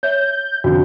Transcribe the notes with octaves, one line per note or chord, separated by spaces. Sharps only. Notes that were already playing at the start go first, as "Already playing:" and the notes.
C#5 E5 G6
F2 D3 F#4